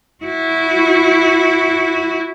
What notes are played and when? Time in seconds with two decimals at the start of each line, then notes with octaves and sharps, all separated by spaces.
0.24 E4 F#4